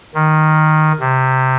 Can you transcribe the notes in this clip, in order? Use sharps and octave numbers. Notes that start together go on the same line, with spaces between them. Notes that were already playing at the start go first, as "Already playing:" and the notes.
D#3
C3